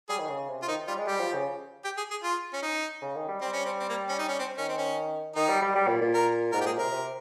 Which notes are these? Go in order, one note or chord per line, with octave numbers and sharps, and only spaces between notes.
G3 G#4
D#3
C#3
C3
F4
D#3 D#4
G3 F4
G#3
G3 G4
F3
C#3
G4
G#4
G#4
F4
C#4
D#4
C#3
D#3
G3
G3 C4
C#4
C4
C4
A#3
C#4
D#4
C#4
C4
D#3 C#4
C4
C#4
D#3 D#4
G3
G3
G3
A#2
A#2
A#4
G#2 A#4
G4
A#2 G#4
C3 A#4
C3